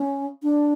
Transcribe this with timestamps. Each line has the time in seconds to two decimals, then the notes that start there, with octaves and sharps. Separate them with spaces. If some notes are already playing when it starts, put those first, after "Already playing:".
Already playing: C#4
0.43 D4